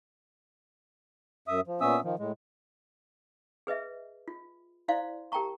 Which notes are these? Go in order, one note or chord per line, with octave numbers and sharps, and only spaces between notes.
F#2 E5 D#6
F3
A#2 B3 C#4 E5 D#6 E6
D#3 F3
A2 G#3
G#4 B4 D#5 E5
F4
E4 C5 D5 F5 C6
G4 A#4 G5 A5 A#5 C#6